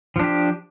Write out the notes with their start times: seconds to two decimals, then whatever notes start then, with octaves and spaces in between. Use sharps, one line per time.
0.16 F3
0.19 D4
0.23 G4